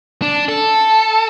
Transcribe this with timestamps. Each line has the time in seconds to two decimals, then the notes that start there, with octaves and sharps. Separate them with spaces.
0.22 D4
0.49 A4